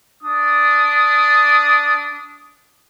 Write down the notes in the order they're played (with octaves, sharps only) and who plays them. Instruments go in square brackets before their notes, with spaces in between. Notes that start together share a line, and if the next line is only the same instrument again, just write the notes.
[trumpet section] D4 D#6